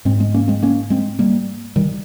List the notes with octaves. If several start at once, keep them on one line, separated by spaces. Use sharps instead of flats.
G#2 G#3 C4
G#3 C4
A#3 C#4
G#3 C4
A#3 C#4
G#3 C4
G3 A#3
D#3 G3